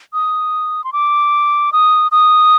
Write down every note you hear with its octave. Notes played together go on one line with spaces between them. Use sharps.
D#6
C6
D6
D#6
D#6